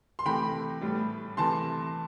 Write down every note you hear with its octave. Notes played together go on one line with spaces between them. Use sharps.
C6
C3 E3 A3 G5 B5
A2 G3 B3
C3 E3 A3 A5 C6